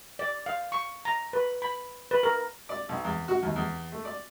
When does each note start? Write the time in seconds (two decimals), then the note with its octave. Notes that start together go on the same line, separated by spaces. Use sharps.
0.19 D5
0.46 F5
0.72 C#6
1.05 A#5
1.33 B4
1.62 B5
2.11 B4
2.23 A#4
2.69 D5
2.89 B1
3.04 E2
3.28 F#4
3.43 D#2
3.56 E2
3.92 A3
4.05 D5